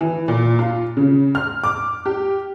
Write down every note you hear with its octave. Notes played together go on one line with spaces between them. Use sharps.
E3
A#2
F4
C#3
F6
D6
G4